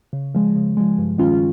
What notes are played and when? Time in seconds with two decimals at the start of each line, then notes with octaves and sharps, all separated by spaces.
0.13 C#3
0.35 F3 G#3
0.56 C#3
0.77 F3 G#3
0.98 G2
1.18 D#3 G#3 C#4 F4